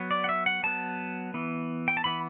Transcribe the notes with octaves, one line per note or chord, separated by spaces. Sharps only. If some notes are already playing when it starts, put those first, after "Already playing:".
Already playing: F#3 B3
D5
F#5
E5
F#5
F#3 B3 A5
E3 B3
G5
A5
E3 B3 B5